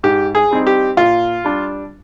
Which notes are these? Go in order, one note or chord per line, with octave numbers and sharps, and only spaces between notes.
G#2 G4
G#4
G3 C4 D#4
G4
A#2 F4
G3 D4